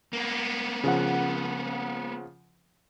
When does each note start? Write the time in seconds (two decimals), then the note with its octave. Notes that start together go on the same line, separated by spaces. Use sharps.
0.13 A#3 B3
0.84 C#3 F3 F#5